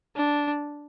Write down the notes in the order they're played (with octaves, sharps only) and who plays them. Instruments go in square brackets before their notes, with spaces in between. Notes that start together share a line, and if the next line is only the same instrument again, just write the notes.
[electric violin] D4